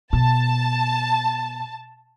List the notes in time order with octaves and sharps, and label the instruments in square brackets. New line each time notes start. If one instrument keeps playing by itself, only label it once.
[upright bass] B2 [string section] A5